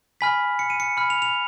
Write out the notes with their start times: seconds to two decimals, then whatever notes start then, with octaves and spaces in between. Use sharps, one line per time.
0.21 G#5 B5 F6 B6
0.59 C#7
0.70 D#7
0.80 C#7
0.97 B5 F6
1.10 F7
1.22 F7